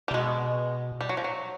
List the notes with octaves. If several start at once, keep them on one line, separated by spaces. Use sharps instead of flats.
G3
C3
B2 G#3
G3
F#3
F3
F#3